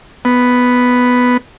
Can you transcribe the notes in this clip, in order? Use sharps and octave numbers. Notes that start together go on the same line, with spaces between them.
B3